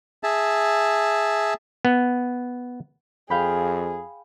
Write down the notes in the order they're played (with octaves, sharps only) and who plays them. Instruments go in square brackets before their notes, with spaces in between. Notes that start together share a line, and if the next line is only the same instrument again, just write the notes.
[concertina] G#4 E5 A5
[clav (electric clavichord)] B3
[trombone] F2 [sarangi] G#4 [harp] F5 G5 B5